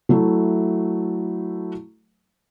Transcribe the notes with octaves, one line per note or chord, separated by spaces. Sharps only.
F#3 A3 E4